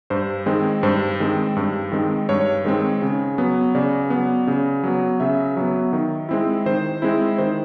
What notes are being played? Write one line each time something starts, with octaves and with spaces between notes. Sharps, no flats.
G2 C5
D#3 G#3 C4
G2 C5
D#3 G#3 C4
G2
D#3 G#3 C4
G2 C#5
D#3 G#3 C4
C#3
F#3 B3
C#3 D5
F#3 B3
C#3
F#3 B3
C#3 E5
F#3 B3
D#3
G#3 C4 E4
D#3 C5
G#3 C4 E4
D#3 C5